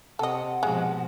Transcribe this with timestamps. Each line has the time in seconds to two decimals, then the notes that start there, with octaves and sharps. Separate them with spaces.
0.19 C3 A4 D#5 F#5
0.63 G#2 B2 F3 G#3